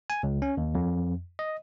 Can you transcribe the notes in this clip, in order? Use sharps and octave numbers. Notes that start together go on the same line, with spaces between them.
G#5
C#2
C#4
D#2
F2
D#5